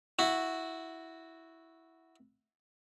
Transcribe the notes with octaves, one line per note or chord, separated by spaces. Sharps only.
E4 F#4